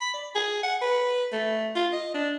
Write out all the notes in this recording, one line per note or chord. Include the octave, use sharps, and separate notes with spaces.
B5
D5
G#4
F#5
B4
A3
F4
D#5
D4